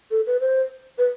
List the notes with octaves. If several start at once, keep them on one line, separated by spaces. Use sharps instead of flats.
A4
B4
C5
B4